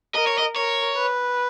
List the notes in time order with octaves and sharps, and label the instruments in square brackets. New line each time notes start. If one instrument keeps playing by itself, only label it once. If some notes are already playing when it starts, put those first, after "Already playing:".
[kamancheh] A#4 [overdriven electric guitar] D#5
[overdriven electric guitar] C#5
D#5
[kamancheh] A#4 [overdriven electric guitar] C#5
[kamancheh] B4